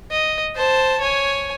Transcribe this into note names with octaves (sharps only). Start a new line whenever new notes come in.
D#5
C5 A5
C#5 G#5